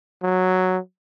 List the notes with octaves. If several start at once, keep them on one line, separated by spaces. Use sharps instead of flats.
F#3